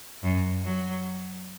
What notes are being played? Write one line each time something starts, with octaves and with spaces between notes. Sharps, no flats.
F#2
F#3